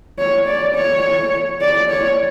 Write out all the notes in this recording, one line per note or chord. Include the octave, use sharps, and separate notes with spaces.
C#5
D5
C#5
D5
C#5